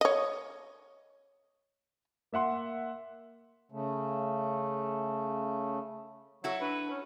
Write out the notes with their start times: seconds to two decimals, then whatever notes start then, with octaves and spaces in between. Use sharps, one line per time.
0.01 C#5 D#5
2.32 A#3 E5 F#5 C6
3.72 C#3 A3
6.44 F#3 E4 F#4 A4
6.61 D4 B4
6.90 C#4